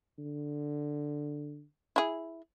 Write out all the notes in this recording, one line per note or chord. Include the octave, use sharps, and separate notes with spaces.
D3
E4 G#4